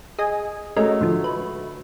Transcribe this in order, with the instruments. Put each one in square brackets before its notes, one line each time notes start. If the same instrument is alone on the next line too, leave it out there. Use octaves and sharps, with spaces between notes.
[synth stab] G#4 D#5 G#5
[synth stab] G#3 C#4 A#4 [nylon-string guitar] A3 F#4 D#5
[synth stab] G#2 D3 F3
B4